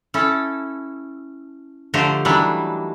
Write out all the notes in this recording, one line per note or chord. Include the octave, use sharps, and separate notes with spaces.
C#4 E4 A4
D3 F3 A3 G4 C5 A#5
D#3 E3 F#3 G3 D4 E4